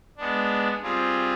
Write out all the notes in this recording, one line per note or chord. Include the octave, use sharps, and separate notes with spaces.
G#3 B3 D4
G3 C4 F4 G#4